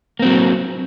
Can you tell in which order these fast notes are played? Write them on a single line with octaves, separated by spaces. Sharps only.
A#3 C4 F#3